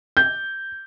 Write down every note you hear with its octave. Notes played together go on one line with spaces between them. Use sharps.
G6